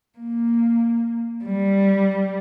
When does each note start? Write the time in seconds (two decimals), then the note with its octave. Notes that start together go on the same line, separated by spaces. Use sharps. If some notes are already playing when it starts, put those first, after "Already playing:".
0.19 A#3
1.45 G3